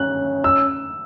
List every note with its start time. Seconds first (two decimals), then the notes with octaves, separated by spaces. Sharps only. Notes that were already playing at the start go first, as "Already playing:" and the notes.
Already playing: C#4 F#6
0.44 E6